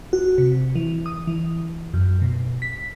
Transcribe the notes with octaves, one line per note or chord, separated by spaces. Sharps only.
F#4
C3
E3
D#6
E3
F#2
B2
B6